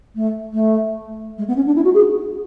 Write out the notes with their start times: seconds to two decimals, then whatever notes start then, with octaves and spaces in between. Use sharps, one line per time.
0.15 A3
0.53 A3
1.38 G#3
1.48 B3
1.56 C#4
1.66 D4
1.75 E4
1.84 F#4
1.94 G#4